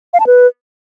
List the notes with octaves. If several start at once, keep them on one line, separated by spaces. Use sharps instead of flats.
F5
A5
B4